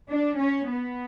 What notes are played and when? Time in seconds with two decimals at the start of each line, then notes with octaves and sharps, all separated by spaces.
0.09 D4
0.39 C#4
0.69 B3